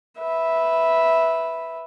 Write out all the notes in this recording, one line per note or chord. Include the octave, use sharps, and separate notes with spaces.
B4 E5